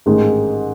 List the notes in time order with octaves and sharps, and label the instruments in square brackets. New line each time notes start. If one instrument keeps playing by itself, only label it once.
[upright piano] A1 G#2 D#3 G#3